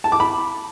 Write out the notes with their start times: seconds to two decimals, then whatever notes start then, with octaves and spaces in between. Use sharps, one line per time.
0.04 A5
0.12 D6
0.20 B5